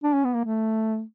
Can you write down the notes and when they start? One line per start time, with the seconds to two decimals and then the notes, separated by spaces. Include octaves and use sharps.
0.04 D4
0.14 C#4
0.25 B3
0.34 A#3
0.45 A3